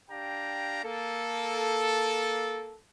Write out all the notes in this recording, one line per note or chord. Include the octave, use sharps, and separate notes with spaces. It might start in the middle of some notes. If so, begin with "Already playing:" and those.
D4 G4 F5 G5 A#5
A#3 A4